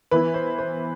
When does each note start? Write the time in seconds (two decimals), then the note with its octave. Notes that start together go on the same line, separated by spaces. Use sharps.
0.11 E3 B3 E4 B4
0.34 C5
0.59 C5